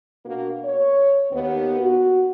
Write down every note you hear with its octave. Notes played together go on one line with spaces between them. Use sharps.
B2 A#3 D4 F#4
C#5
D#2 B3
F#4